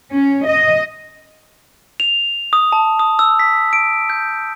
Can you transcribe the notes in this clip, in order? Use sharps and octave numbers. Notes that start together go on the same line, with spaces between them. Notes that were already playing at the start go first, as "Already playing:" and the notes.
C#4
D#5
F7
D#6
A5
D#6
E6
B6
D7
G6